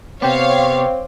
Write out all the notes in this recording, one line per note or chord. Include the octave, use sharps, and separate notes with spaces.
C3 B3 C4 C#5 F5 G5 C6 D6